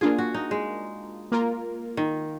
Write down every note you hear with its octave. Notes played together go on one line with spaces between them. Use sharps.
A#3 D4 F4 G#4
F#4
D#4
G#3
A#3 F4 A#4
D#3